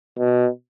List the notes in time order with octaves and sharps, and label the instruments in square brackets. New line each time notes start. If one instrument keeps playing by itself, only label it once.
[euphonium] B2